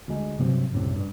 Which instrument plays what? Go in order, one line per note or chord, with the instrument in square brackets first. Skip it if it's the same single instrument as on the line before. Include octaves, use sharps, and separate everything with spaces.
[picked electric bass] D2 G#3
G2 C3 F#3 C4
C2 F#2 A2 C3
G2